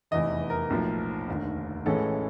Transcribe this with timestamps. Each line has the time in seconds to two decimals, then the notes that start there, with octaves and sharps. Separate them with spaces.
0.11 F1 E2 C3 E3 D#5
0.50 A#4
0.70 B1 A2 F3 A#3
1.28 F1 D#2 D3
1.86 A1 A2 E3 G#3 C#4 A4